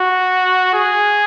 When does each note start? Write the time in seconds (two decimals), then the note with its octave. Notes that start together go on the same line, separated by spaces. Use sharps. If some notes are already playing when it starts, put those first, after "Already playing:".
Already playing: F#4
0.74 G#4